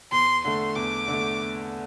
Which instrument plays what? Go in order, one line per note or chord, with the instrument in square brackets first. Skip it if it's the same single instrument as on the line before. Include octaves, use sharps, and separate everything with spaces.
[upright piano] E2 [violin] C6
[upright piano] D3 A3 [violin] C6
[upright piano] E2 [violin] D6
[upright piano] D3
A3